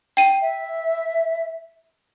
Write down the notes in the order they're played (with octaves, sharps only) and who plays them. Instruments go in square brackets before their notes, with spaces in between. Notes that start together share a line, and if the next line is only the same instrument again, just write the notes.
[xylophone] G5 D#7
[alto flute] E5